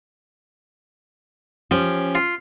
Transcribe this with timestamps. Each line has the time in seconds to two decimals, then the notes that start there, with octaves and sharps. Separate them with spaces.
1.71 F3 C#4 G4
2.15 F4